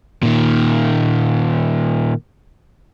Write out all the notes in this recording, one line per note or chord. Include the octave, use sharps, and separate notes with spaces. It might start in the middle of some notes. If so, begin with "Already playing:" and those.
A#2 D#3